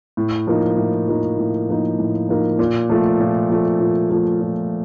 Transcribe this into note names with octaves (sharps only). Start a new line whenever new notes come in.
A2
F3 A#3 D#4
A2
F3 A#3 D#4
A2
F3 A#3 D#4
A2
F3 A#3 D#4
A#2
F3 A3
A#2
F3 A3
A#2
F3 A3
A#2